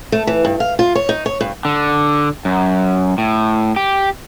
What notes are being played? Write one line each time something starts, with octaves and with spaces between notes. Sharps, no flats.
A3
E3
G2
F5
F4
C#5
D#4
C#5
G2
D3
F#2
A2
G4